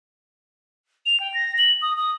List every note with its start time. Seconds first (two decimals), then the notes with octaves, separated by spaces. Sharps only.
1.06 F7
1.20 G5
1.34 A#6
1.58 F#7
1.82 D#6
1.97 D#6